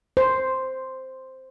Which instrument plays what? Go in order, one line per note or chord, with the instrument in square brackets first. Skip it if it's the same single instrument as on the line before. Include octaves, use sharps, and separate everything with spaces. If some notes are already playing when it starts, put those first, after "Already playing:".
[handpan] C5